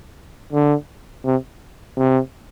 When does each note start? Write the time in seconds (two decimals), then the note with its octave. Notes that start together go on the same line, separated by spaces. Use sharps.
0.52 D3
1.25 C3
1.97 C3